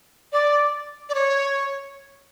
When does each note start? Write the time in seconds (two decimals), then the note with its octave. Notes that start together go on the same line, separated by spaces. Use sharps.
0.32 D5
1.09 D5
1.14 C#5